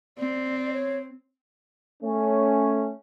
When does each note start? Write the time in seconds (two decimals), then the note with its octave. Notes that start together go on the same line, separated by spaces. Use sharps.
0.18 C4 D5
0.73 C#5
2.01 A3 C#4